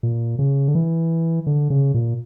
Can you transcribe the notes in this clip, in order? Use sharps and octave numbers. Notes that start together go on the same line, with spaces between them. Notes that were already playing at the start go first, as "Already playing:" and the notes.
A#2
C#3
D3
E3
D3
C#3
A#2